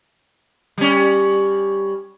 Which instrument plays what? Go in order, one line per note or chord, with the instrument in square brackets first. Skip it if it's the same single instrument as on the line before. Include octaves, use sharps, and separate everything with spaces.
[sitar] G3 C#4